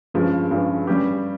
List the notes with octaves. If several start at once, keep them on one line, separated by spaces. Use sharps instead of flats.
G2 F3 G#3 C#4
G2 F3 G#3 C#4
G3 C#4 G4